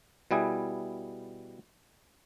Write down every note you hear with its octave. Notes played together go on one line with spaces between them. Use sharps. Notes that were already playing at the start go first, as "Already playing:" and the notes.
B2 G3 E4 G#4